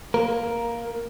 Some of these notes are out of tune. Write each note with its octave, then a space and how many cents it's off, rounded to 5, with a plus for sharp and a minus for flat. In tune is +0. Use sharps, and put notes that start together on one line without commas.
A#3 +0 A#4 +10